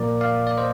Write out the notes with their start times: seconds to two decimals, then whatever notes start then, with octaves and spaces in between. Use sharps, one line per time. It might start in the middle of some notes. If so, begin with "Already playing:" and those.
Already playing: A#2 F3 A#3 A#4 D5
0.21 D5 F5
0.47 D5
0.57 C5 D#5